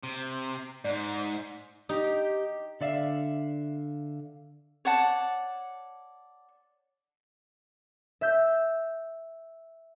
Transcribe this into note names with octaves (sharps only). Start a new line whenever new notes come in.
C3
G#2 D5
D#4 G4
D3 D5 E5 F5
C#5 D5 F#5 A5
E5 G6